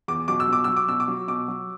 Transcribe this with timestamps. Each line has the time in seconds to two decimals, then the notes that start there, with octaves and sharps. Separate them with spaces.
0.08 E2 D6
0.28 B2 F#3 D6
0.40 E6
0.48 B2 D6
0.64 F#3 E6
0.77 D6
0.88 B2 E6
1.00 D6
1.08 F#3
1.28 B2 D6
1.48 F#3